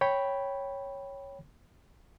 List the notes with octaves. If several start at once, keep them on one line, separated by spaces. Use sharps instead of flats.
C#5 G5 B5